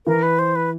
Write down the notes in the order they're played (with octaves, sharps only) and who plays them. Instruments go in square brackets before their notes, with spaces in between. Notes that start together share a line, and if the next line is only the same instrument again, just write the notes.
[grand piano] E3 [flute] A#4
[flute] B4
C5
B4